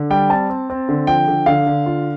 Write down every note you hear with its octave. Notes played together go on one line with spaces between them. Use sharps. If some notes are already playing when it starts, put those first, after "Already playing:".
Already playing: D3
G3 G5
C4 A5
C4
C4
D3
F3 G5
D3
D3 F5
D3
F4